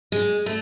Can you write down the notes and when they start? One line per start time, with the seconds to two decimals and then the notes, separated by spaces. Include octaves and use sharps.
0.12 G#3
0.46 A3